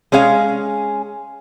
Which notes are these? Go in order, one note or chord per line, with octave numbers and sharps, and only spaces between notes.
G#3 C#4 G#4 F5